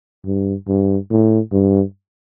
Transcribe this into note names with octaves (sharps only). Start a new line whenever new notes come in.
G2
G2
A2
G2